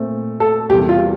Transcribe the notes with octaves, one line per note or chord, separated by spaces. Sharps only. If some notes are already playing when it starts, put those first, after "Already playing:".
Already playing: A#2 A3 C4
A4
E2 C3 G3 A#3 G4
F4